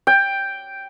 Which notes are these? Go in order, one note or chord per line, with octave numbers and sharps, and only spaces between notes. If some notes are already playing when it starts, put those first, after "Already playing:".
G5